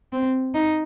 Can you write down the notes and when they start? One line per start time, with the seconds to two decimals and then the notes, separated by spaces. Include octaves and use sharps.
0.13 C4
0.55 D#4